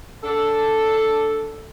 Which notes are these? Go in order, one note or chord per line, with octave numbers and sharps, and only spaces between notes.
D4 A4